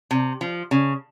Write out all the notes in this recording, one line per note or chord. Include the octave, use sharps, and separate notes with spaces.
C3
F3
C#3